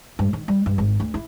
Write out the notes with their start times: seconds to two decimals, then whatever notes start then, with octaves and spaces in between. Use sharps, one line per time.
0.19 G2
0.33 D#3
0.48 G3
0.66 G2
0.78 G#1
1.00 D2
1.14 E4